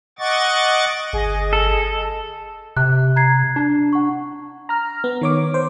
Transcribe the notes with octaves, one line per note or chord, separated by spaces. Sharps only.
D#5 F#5 C#6 D6 A6
G1 G#4 D#5
A4
C3 F#6
A#5 G#6 C7
D4
F#5 C#6
A#5 F6
B3
D#3 C#5 D6
C5